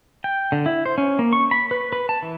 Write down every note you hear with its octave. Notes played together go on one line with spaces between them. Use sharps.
G5
D3
E4
C5
C#4
A#3
C#6
B5
B4
B4
A5
E3